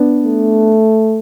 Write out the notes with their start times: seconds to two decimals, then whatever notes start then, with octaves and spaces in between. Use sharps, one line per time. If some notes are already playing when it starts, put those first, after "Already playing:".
Already playing: B3 D4
0.25 A3